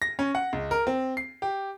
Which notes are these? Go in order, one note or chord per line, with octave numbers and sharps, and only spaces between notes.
A#6
C#4
F#5
C#2
A#4
C4
C7
G4